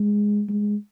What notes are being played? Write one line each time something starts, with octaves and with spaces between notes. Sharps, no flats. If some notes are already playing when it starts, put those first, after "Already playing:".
Already playing: G#3
G#3